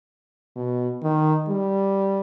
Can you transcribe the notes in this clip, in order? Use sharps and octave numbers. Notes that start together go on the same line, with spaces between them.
B2
D#3
G3